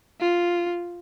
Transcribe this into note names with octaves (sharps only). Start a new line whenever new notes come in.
F4